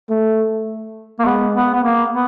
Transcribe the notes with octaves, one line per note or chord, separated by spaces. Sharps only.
A3
A#3
G#3 B3
B3
B3
A#3
B3